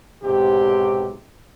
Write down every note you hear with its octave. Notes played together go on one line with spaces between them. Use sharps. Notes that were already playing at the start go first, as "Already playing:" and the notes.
B1 G#2 C3 G4